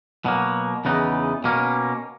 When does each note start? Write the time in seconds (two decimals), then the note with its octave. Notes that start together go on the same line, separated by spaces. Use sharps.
0.25 B2 F#3 A#3
0.85 E2 C#3 E3 B3 D#4
1.44 B2 A#3 C#4